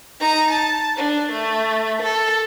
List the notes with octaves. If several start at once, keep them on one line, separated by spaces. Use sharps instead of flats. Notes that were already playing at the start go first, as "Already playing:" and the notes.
D#4 A#5
A5
D4
A3
A4